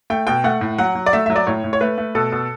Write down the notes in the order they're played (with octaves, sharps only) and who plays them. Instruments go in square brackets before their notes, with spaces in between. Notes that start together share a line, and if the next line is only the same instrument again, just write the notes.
[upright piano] A3 G5
B2 G5
A3 F#5
A2
F#3 F#5
F#3
D5
A3 E5
F#3 E5
D5
A2 C#5
A2
C#5
A3 B4
A3
B2 A4
B2